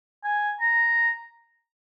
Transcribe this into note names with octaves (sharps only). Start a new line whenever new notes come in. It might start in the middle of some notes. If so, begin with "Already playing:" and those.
G#5
A#5